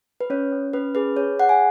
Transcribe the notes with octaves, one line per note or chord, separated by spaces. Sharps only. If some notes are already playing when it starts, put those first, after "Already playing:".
B4
C#4 C#5
C#4
C#4 B4
G#4 B4
G#4 C#5
G#4 F#5
G#5